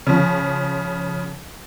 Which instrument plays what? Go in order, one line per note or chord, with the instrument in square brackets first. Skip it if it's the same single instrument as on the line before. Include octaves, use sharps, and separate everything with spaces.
[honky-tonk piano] C#3 F3